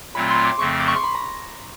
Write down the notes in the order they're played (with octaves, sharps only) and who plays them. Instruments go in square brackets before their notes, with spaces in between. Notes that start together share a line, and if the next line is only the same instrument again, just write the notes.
[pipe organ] A#2 F#3 A3 C4 F4 [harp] B5
[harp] C6
D6
[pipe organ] F2 C#3 F3 A3 C4 [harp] C#6
[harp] D6
C#6
C6
B5
A#5